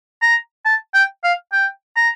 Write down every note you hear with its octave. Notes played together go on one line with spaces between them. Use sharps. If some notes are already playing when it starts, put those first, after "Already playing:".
A#5
A5
G5
F5
G5
A#5